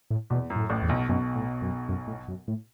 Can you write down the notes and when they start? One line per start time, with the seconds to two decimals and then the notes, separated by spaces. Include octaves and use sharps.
0.10 A2
0.30 E2 B2
0.50 F#2
0.56 A2
0.69 A1 A2
0.82 E2
0.89 B1 B2
1.09 B1 F#2 B2
1.35 A2
1.62 F#2
1.89 F#2
2.07 A2
2.28 F#2
2.48 A2